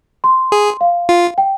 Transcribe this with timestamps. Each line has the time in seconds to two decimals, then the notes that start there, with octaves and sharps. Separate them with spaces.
0.24 C6
0.52 G#4
0.81 F5
1.09 F4
1.38 G5